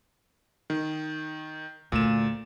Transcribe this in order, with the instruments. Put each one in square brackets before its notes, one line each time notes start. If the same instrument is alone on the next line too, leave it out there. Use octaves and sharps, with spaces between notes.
[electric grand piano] D#3
[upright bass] D2 [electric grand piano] A#2 E7